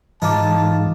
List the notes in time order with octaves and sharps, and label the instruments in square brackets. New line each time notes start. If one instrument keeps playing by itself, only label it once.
[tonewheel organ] G#2 [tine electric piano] E3 D6 [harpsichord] D#4 F4 [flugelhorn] A5